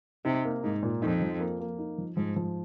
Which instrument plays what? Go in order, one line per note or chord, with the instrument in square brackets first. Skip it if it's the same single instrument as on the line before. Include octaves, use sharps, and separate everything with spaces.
[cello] C3 [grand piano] D#4
[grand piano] A#3
[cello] G#2 [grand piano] D#4
[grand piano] A#2
[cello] F2 [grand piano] D#4
[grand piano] F3
A#3
A#3
D#4
F3
[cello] G#2 [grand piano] F3
[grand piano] F3